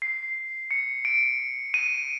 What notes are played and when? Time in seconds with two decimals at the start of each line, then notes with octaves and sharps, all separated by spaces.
0.02 C7
0.71 C#7
1.05 D7
1.74 D#7